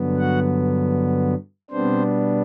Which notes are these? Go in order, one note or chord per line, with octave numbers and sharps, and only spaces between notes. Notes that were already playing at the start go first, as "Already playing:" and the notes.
Already playing: G2 D3 F#3 B3
F#4 F#5
B2 G3 B3 C4 D4 C5